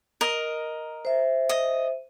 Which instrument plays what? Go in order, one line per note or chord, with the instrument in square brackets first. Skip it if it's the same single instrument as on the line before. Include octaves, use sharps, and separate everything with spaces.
[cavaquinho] A#4 D#5
[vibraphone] C5 E5
[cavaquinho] D#5